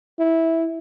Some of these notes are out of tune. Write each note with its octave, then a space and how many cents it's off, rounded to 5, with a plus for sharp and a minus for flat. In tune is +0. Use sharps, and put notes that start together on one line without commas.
E4 -10